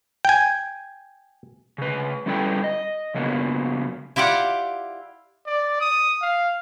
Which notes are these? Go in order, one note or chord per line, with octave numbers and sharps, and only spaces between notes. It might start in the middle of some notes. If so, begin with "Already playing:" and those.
G5 G#5
C#3 B4
G3 C#4 E4 A4 B4 G5
D#5
C#3 F#3 A#3 B3
E4 F4 G4 D5 F#5
D5
D#6
F5